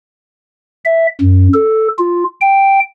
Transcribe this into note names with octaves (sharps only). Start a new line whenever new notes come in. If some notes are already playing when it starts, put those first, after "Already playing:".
E5
F#2
A4
F4
G5